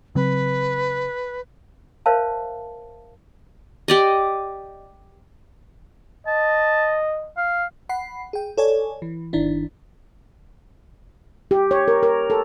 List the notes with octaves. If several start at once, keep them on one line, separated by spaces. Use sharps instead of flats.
C#3 F#3 C4 B4
A#4 C5 C#5 E5 F5 A5
G4 D5 D#5
D#5 A5
F5
F#5 B5 C7
G#4 G5
A4 C#5 D5 G#5
E3
G1 D#3 D4 E4
G4
C#5
A#4
A#4
A4